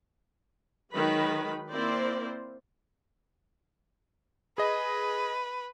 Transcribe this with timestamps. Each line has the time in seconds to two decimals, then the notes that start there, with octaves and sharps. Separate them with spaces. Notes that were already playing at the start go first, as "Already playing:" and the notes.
0.92 D#3 F#3 G#3 B4 B5
1.71 A#3 C4 E4 A#4 C5 D5
4.58 G#4 B4 D#5